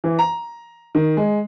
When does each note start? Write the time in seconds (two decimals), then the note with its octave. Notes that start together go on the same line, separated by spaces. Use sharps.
0.04 E3
0.19 A#5
0.95 D#3
1.17 G#3